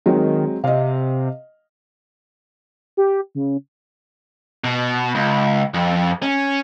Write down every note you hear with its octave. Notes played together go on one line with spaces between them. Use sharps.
D#3 F#3 G#3 C4
C3 D#5 F5
G4
C#3
B2
C#2
F2
C#4